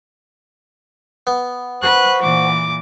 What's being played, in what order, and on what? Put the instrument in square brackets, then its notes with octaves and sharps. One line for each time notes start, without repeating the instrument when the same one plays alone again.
[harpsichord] B3
[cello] B4 [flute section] C5 F#5 C#6 [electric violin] F#6
[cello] A#2 E3 [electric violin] D6